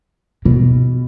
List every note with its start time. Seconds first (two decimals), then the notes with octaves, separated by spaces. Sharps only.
0.45 B2